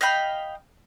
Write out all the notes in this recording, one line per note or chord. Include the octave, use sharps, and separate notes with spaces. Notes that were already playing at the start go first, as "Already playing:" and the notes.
D#5 F5 G5 B5